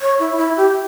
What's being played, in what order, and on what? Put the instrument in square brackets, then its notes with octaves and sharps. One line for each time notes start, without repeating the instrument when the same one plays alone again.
[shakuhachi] C#5
E4
E4
G4